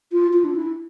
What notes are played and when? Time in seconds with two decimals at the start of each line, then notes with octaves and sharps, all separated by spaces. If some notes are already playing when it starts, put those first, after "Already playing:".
0.12 F4
0.33 F4
0.45 D4
0.56 E4